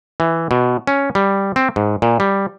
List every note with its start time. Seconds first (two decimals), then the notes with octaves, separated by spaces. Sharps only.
0.20 E3
0.51 B2
0.87 C#4
1.15 G3
1.56 C4
1.76 G#2
2.02 A#2
2.20 G3